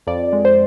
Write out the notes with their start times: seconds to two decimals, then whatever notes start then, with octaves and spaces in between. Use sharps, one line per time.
0.07 F2 D5
0.33 G#3
0.45 C5